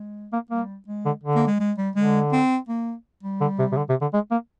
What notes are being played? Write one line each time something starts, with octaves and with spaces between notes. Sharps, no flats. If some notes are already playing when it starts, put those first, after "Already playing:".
Already playing: G#3
A#3
G3 A#3
G#3
D3
D3
A#3
G#3
G#3
G3
D3 G#3
C4
A#3
G3
D3
C3
C3
D3
C3
D3
G#3
A#3